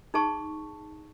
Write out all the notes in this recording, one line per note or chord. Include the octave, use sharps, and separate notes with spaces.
D#4 G#4 A5 C#6